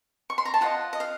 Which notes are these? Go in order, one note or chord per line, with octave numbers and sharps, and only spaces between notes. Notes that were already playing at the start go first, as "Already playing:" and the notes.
C#6
C6
A#5
A5
F4 C5 D#5 F#5
D#5
F5